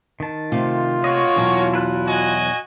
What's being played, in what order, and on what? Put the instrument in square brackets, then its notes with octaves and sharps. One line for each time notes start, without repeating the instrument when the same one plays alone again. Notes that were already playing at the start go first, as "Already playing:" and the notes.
[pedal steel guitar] D#3 A5
[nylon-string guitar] C3 A3 F5 [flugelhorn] F4
[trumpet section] A#3 C#5 [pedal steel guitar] F#4 D#5
[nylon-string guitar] E2 B2 F#3
[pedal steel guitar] E4 B4 F#6
[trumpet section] F#4 D#5 G#5